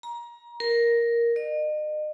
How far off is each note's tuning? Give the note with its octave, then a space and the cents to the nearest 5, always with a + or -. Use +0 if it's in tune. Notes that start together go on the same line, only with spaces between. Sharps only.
A#5 +25
A#4 +5
D#5 -40